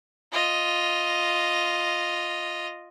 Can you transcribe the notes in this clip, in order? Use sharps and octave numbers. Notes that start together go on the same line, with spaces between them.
F4 D#5